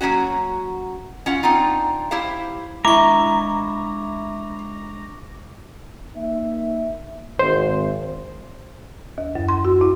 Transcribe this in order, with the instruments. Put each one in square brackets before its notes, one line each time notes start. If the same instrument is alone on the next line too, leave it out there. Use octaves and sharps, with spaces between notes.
[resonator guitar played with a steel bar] F#3 G3 A#3 C#4 F#4
C#4 F4 F#5
C4 D4 D#4 F4
E4 G4 C5 F5
[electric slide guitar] G#3 D4 E5 [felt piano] E4 [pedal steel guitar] A#5 [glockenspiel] C#6 D6
[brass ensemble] A#3 D#4 E5
[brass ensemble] G#1 [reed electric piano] C5
[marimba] D#2
F#2
C6
F#4
E4